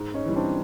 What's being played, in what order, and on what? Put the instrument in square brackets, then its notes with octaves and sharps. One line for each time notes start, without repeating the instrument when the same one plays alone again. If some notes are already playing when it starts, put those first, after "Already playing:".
Already playing: [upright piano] G#2
[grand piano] C#4 D#4
[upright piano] E3 G3
[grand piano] C4 D4